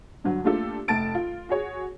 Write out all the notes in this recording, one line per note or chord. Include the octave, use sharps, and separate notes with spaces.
G2 D3 F#3
A3 A#3 D4 F4 G4 A4
F1 A3 A5 A6 D7
F4
F#4 G#4 C#5